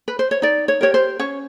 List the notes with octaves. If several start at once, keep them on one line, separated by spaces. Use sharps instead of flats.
B4
C5
C#5
D#4 D5
C#5
G4 A#4 C#5
C5
C#4 C#5